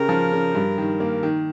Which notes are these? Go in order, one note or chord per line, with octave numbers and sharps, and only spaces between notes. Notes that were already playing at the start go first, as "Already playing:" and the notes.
Already playing: C#3 G4 A#4
F3
C#3
G2
D#3
A#3
D#3